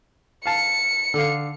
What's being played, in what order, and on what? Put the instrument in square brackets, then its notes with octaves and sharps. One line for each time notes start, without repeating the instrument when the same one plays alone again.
[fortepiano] F5 A5 [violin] C#7
[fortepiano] D3 F5